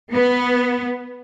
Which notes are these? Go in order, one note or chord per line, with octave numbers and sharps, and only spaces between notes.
B3